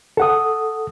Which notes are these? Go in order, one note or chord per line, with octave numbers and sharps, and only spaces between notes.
A4 F#5 D#6